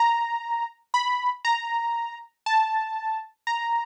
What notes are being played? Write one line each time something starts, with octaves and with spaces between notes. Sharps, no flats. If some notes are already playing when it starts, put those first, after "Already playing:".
Already playing: A#5
B5
A#5
A5
A#5